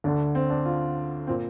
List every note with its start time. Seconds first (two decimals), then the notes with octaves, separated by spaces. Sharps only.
0.04 D2 D3 D4
0.35 C4
0.50 D4
0.66 F4
1.27 A#2 C4